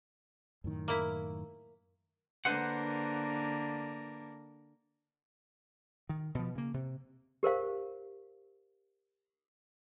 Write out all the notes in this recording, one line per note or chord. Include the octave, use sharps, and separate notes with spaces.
F#2 A2 D#3
A#3 E4
D3 A#3 B4 C5 F#5
D#3
B2 F3
C#3 A#3
C3
G4 A#4 C5 F5